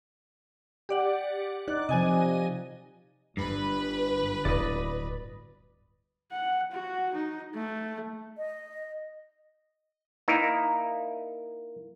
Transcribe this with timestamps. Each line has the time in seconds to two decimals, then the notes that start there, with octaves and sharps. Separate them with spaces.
0.89 G4 D5 F#5
1.68 D#4 D5 F#6
1.89 C3 F3 D#5 G#5 D#7
3.37 G1 G2 B4
4.45 D1 D5 D#5
6.32 F#5
6.72 F#4
7.14 D#4
7.55 A3
8.38 D#5
10.28 A#3 D#4 E4 A#4 E5